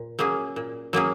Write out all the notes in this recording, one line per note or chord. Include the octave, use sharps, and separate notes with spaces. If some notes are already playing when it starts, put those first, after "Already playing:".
Already playing: A#2
F#3 A#3 C#4 G#4
A#2
F#3 A#3 C#4 G#4